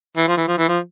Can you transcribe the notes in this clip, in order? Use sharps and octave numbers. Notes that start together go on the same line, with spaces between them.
E3
F3
E3
F3
E3
F3